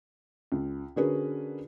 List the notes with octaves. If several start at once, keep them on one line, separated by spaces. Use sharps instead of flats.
C#2
D3 C#4 F#4 G#4 A#4 B4